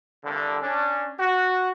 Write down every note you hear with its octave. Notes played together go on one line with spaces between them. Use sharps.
C2 G2 D3
C#4 D4
F#4